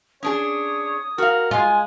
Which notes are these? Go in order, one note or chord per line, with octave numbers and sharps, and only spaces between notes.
C#4 D4 G#4 C#5 D#6
F#4 A#4 F5
G#3 F4 G#5